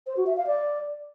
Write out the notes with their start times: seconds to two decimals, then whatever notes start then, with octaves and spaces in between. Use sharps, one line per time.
0.07 C5
0.17 F#4
0.27 E5
0.37 F5
0.47 D5